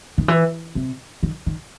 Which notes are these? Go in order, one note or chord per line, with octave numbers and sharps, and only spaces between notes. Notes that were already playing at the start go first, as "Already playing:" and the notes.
D#3
E3
C3
D#3
D#3